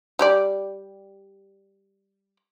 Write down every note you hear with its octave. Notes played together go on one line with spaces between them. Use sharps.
G3 G4 D5